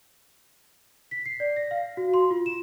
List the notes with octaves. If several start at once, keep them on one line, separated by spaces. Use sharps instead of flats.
B6
C7
D5
A#6
F5
F#4
C6
F4
E7